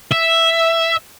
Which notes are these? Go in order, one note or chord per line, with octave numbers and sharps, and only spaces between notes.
E5